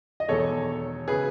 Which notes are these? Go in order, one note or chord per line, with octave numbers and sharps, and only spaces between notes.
D#5
E1 E2 D#3 A4 C#5
C#3 G#4 B4